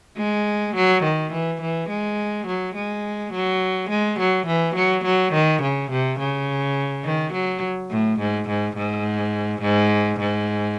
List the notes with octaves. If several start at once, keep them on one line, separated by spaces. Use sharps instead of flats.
G#3
F#3
D#3
E3
E3
G#3
F#3
G#3
F#3
G#3
F#3
E3
F#3
F#3
D#3
C#3
C3
C#3
D#3
F#3
A2
G#2
G#2
G#2
G#2
G#2